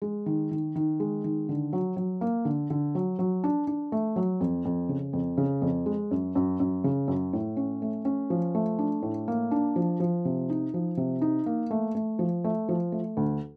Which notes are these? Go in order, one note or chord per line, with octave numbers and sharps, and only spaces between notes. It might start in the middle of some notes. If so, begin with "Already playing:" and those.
G#3
D#3
D#3
D#3
G#3
D#3
D3
F#3
F#3
A#3
D3
D3
F#3
F#3
D4
D4
A3
F#3
F2
F2
C#3
F2
C#3
F2
G#3
F#2
F#2
F#2
C#3
F#2
A2
C#4
A3
C#4
F3
A3
D4
A2
A#3
D4
F3
F3
C3
D#4
F3
C3
D#4
A#3
A3
A3
F3
A3
F3
A3
D2